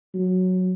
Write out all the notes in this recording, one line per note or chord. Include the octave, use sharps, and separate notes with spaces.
F#3